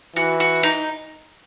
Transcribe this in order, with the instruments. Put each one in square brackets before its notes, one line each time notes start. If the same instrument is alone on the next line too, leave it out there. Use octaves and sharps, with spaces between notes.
[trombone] E3 [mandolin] F#4
[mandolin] F#4
D#4